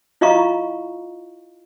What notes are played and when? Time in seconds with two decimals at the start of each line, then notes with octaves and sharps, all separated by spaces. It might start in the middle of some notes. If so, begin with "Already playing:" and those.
0.21 E4 F4 D#5 F5 A#5 C#6